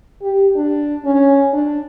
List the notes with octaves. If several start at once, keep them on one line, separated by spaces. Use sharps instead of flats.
G4
D4
C#4
D4